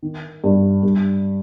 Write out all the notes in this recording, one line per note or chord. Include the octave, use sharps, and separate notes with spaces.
D#3
G2
G2